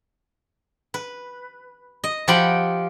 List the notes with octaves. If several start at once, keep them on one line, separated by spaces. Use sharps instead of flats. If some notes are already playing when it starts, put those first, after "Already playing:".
B4
D#5
F3 F4 G4 F#5 G5 B5